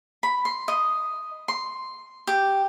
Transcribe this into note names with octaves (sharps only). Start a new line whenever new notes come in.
B5
C6
D#5
C6
G4